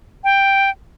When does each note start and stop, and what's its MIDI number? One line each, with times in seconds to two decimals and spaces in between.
0.24 0.70 79